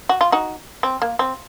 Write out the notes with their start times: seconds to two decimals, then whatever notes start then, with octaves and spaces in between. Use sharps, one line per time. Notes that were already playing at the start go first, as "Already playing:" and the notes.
0.09 F#4
0.21 F4
0.32 D#4 F#4
0.83 C4
1.02 A#3
1.19 C4